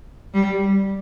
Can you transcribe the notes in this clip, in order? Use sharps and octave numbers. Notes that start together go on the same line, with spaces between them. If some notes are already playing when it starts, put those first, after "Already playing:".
G3